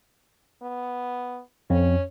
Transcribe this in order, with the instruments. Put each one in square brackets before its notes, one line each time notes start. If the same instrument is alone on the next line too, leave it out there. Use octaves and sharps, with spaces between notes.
[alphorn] B3
[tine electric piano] F2 [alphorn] C#4